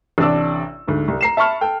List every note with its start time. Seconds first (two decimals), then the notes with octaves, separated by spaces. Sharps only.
0.18 A1 C3 D4 D5 E6
0.88 D2 G#2
1.08 C2
1.21 A#5 C7 E7
1.37 E5 A5 B5 C#6 F6
1.61 A4 G5